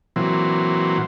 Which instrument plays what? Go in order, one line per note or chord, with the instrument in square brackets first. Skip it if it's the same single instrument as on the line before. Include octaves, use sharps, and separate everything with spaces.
[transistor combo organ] A#2 E3 F#3 C4